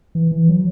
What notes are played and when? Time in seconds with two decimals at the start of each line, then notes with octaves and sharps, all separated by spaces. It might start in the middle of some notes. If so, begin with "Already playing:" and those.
0.15 E3
0.32 E3
0.49 F#3